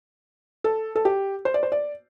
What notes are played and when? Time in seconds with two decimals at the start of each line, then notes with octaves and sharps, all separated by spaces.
0.64 A4
0.95 A4
1.05 G4
1.45 C5
1.54 D5
1.63 C5
1.72 D5